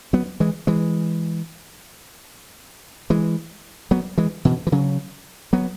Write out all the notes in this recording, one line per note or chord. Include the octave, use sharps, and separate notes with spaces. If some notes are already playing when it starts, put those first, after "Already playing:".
F#3 B3
E3 G#3
E3 G#3
E3 G#3
F#3 B3
E3 G#3
B2 E3
E3
C#3 F#3
F#3 B3